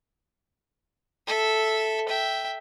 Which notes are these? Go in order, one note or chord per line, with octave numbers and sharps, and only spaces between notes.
A4 E5
E5 G5